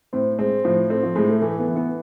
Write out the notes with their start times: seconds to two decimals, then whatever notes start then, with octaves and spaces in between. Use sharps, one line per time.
0.13 A2 C4
0.38 G#3 C4
0.65 A2 F3
0.90 A3 C4
1.03 F3
1.15 A2 G#3
1.29 A3
1.42 E3 A3
1.59 B3
1.68 E3
1.76 B3